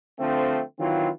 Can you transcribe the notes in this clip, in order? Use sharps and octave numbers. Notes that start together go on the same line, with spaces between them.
D3 F3 A3 C4
D#3 E3 F#3 C4 E4 F4